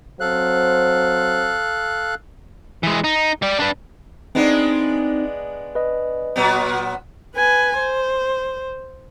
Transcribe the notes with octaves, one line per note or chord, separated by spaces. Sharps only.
F#3 C4 A4 C5 F5 F#6
E3 G#3
D#4
G3 D5
D4 B4
G#3 B3 C4 D4 D#4
B4 D#5
A#2 F#3 B3
B4 G#5
C5